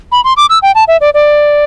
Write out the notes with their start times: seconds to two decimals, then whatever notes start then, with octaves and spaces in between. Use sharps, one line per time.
0.12 B5
0.24 C6
0.37 D6
0.49 E6
0.62 G5
0.75 A5
0.88 E5
1.01 D5
1.14 D5